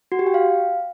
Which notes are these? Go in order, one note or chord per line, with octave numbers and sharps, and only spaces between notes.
F#4
G4
G5
F5